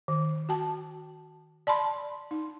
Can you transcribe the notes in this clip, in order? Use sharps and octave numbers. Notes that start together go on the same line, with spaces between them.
D#3
F#4 G5 A5
D5 A5 B5 C6
D#4